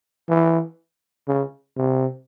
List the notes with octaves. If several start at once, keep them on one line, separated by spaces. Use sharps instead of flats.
E3
C#3
C3